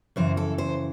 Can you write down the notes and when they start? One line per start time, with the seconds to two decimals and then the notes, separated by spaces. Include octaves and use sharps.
0.16 F#2 C#3 E3 C5
0.37 A4
0.58 C5